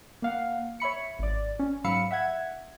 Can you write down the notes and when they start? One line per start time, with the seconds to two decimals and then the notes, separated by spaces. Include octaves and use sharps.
0.22 A#3 F5 F#5
0.80 C#5 E5 B5 C#7
1.19 G#1 D5
1.59 C#4
1.84 G#2 F#3 F5 B5 E6 C#7
2.11 E5 F#5 G#6